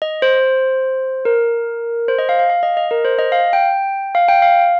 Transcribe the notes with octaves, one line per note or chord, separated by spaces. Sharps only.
D#5
C5
A#4
C5
D#5
F5
F5
F5
D#5
D#5
A#4
C5
D#5
F5
G5
F5
G5
F5